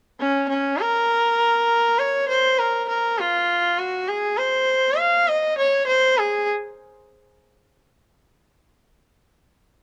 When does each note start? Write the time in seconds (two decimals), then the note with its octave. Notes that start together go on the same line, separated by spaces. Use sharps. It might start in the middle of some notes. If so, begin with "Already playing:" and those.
0.20 C#4
0.49 C#4
0.79 A#4
1.99 C#5
2.29 C5
2.59 A#4
2.89 A#4
3.19 F4
3.79 F#4
4.08 G#4
4.38 C5
4.99 F5
5.28 D#5
5.58 C#5
5.87 C5
6.18 G#4